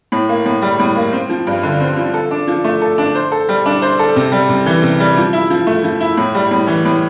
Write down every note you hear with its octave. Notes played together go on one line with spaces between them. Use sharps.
A2
A#3
A2
G3
A2
A#3
C4
F3
G2
D3
C4
F3
A4
D4
F3
A3
A4
D4
C5
A4
G3
D4
C5
A4
C3
G3
C3
E3
C3
G3
F3
E4
F3
A3
F3
E4
A2
G3
A2
E3
A2